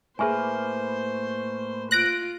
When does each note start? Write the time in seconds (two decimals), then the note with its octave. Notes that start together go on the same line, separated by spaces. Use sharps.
0.19 A2 A#3 G#4 B4 C5 E5 G#5
1.91 F4 F#6 A#6 D7